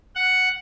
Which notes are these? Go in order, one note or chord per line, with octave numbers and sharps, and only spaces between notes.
F#5